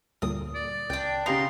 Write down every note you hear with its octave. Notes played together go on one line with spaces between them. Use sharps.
D2 G2 A#2 D#6
D5
C#2 D4 G5
C#3 B3 D#4 G4 F5 A#5 C6